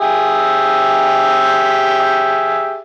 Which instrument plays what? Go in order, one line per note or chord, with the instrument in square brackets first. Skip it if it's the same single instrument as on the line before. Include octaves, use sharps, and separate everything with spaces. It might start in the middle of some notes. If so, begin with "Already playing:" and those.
[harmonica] G4 G#4 E5